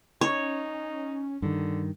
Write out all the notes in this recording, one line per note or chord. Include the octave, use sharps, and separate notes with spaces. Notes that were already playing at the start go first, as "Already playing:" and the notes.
C#4 D#4 C#5
G2 D3 D#3